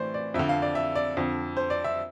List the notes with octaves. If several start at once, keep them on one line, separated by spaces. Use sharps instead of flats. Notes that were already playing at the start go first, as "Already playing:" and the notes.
Already playing: A2 E3 C5 D5
D5
F2 D3 E5
F5
D5
E5
D5
F2 D3
C5
D5
E5